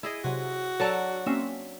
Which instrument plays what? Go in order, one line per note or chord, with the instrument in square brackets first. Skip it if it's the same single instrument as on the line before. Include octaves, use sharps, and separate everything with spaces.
[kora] E4 G#4 D#5
[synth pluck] C3 F#3 [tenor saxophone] F#4
[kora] F#3 D4 D5 [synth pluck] A4 A5 A#5
[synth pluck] A#3 C4 C#4 [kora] E5